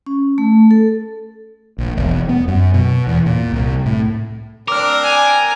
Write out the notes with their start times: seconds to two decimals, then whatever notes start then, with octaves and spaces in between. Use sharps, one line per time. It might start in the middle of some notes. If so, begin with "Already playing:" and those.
0.06 C#4
0.38 A3
0.71 A4
1.78 A#1
1.97 E1
2.29 B3
2.48 F#2
2.74 B2
3.07 E2
3.26 A#2
3.52 C2
3.86 A2
4.68 C4 D4 A#4 D6 F6
5.03 G#5